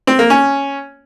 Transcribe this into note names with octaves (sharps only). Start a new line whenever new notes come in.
C4
A#3
C#4